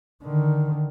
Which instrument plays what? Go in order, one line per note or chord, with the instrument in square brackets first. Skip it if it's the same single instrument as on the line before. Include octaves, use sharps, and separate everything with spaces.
[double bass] D3 D#3